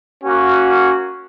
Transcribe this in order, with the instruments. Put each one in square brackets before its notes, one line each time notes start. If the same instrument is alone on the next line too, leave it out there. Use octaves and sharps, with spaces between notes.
[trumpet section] A#3 C#4 F#4